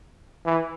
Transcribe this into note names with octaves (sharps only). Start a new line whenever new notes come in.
E3